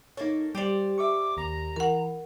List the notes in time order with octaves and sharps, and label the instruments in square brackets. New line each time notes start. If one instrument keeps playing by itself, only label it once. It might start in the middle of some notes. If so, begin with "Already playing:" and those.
[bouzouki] A#3 A4 [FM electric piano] D#4 C#5
[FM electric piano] G3 [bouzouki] G4 C5 D5
[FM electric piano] E5 C#6 [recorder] D6
[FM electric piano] D#2 A#6 [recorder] A#5
[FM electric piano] E3 [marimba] A#4 F#5